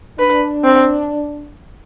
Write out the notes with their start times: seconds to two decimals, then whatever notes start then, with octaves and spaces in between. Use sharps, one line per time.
0.19 D4 B4
0.64 C4